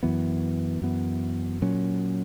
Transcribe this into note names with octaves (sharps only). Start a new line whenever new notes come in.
F#2 E3 B3
F#2 E3 B3
A#2 F#3 C#4